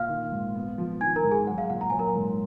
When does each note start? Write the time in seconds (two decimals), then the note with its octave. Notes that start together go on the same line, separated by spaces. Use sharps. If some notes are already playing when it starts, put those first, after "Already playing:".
Already playing: A#2 F5 F6
0.09 D#3
0.32 G#2
0.55 B3
0.78 F3
1.01 D#3 G#5 G#6
1.16 A#4 A#5
1.24 G#2
1.31 G#4 G#5
1.46 F#3 F#5
1.58 F5
1.69 A#2 F#5
1.81 A#5
1.90 F#3 G#5
1.99 A#4 A#5
2.15 G#2